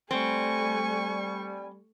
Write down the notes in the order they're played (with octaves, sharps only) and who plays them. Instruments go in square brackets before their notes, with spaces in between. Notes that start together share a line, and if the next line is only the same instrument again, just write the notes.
[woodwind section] G3 [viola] A3 C#6 [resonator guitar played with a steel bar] C4 [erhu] G#5